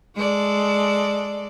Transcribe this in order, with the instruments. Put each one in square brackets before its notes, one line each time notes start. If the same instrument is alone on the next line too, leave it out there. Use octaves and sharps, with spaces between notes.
[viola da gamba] G#3 A4 D5